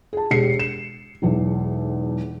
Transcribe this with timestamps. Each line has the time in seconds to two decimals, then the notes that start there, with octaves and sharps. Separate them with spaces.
0.13 G#4 A5
0.31 E1 G4 C7 C#7
0.59 E7
1.22 E1 B1 E2